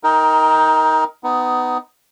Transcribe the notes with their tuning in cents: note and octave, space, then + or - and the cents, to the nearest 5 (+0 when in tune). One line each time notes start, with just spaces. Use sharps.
D#4 +20 A#4 +0 G5 +0
B3 +20 D#4 +0